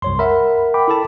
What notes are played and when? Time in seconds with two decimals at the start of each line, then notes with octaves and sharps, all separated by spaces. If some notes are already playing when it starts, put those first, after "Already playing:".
0.02 C2 F#2 C#5 C6
0.19 A#4 E5 F#5 B5
0.74 G5 B5 D6
0.88 E4 A4 A5